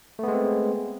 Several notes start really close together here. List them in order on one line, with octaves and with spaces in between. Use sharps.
A3 B3 G#3 C4